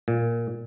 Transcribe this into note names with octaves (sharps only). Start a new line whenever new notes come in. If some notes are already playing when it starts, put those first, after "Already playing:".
A#2